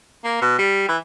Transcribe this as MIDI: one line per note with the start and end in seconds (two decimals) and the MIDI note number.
0.24 0.38 58
0.41 0.58 47
0.58 0.86 55
0.88 0.97 52